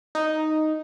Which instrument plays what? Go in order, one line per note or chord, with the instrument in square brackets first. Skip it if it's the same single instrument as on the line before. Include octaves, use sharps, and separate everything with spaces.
[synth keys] D#4